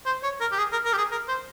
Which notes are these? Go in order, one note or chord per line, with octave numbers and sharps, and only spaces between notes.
C5
C#5
A#4
G4
G#4
A#4
A#4
G4
G#4
A#4
C5